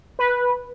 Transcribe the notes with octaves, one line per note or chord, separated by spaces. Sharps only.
B4